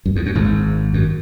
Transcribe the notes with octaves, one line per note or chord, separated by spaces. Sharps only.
F#2
E2
F#2
G#1 G#2
F#2